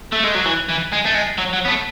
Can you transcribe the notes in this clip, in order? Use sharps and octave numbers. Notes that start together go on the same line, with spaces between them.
A3
G#3
F#3
E3
E3
G#3
A3
G#3
F#3
F#3
B3
A3